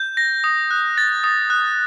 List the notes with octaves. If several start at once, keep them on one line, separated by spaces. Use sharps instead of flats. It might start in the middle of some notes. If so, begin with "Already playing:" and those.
Already playing: G6
A#6
D#6
F#6
A6
D#6
F#6